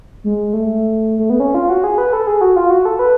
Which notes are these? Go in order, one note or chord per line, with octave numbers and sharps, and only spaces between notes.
G#3
A3
A3
B3
C#4
F4
F#4
G#4
B4
A4
G#4
F#4
F4
F#4
A4
B4